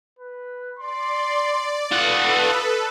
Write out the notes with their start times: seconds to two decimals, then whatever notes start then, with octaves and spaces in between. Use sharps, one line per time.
0.19 B4
0.79 D5 C6
1.92 F4 A4 B4 F#5 D#6